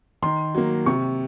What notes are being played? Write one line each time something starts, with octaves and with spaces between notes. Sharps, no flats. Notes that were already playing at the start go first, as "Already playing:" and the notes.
D#3 C6
F#3 A#3
C3 C#6